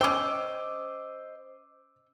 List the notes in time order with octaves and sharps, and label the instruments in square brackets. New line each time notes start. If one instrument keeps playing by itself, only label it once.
[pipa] C#4 G5 [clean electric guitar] C5 D#5 [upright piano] D6 E6